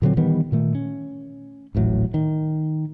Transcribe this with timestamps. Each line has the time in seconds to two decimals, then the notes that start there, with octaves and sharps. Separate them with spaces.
0.02 A#2 D3 F#3 C4
0.17 D#3 E3 G3 B3
0.52 A#2 D#3 A3
0.75 C#4
1.75 D#1 A1 A2 F#3
2.14 D#3